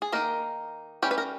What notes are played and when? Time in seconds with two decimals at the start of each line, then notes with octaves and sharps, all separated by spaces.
0.02 G#4
0.12 D#3 A#3 D#4 A#4
1.02 E3 G3 C#4 G4
1.11 B4
1.18 A#4